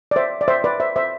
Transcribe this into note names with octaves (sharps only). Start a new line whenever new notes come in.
D5
C5 E5
D5
C5 E5
B4 D5
C5 E5
C5 E5